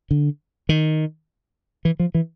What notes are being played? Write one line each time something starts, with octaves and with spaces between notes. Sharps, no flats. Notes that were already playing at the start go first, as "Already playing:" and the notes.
D3
D#3
E3
F3
E3